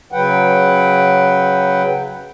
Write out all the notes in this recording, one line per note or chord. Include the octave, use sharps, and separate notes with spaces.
C#3 F#3 B4 F#5 G5